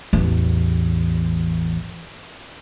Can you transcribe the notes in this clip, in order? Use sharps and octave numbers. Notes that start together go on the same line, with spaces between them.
A1 E2